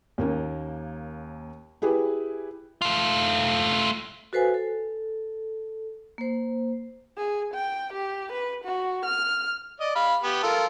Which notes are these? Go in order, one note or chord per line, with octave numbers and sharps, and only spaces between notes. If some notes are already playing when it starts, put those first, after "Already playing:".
D#2 A#3 C#4
E4 G4 G#4 B4
A3 F4
F#4 A4 B4 C5 F5 G#5
A4
A#3 C5
G#4
G5
G4
B4
F#4
F6
D5 D#5
F5 B5
B3 G4
F4 A4 A#4